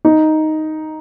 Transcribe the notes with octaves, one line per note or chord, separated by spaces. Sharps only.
D#4